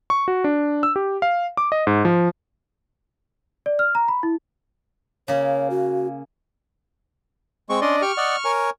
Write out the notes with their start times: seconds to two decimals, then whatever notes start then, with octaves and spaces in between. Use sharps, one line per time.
0.10 C#6
0.28 F#4
0.44 D4
0.83 E6
0.96 G4
1.22 F5
1.57 D6
1.72 D#5
1.87 G#2
2.05 F3
3.66 D5
3.79 F6
3.95 A#5
4.08 B5
4.23 E4
5.28 C#3 A#3 C#5
5.70 F#4
7.70 G#3 C4 C#6
7.81 C#4 D4 D5 D#5 C6
8.02 G4 C#6 F6
8.17 D5 D#5 F#5
8.45 A#4 C#5 G#5